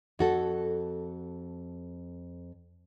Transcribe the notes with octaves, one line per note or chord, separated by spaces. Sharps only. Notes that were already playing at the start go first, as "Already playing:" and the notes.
F2 F#4 A4